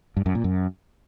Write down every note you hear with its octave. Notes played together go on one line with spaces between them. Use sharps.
G2
F#2
A#2
F#2